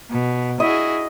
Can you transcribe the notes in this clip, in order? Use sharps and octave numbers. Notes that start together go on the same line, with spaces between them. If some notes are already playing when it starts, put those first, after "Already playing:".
B2
E4 F#4 G#4 D#5